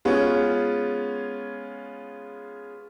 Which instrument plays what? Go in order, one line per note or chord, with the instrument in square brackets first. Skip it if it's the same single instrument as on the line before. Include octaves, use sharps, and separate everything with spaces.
[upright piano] G#3 B3 C#4 F4